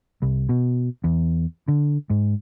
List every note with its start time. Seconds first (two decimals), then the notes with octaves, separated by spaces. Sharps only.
0.22 C2
0.49 B2
1.04 E2
1.68 D3
2.10 G#2